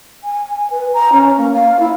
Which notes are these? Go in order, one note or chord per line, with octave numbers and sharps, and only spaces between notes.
G#5
B4
A#5
C#4
A#3
F5
E4